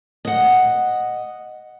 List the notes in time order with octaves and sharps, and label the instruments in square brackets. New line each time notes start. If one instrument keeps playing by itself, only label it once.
[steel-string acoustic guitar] D#5 F#5